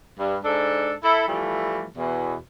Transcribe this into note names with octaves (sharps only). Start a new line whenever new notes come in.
G2
G#2 D4 A4
E4 A4
E3 F3 G3 A3
E2 B2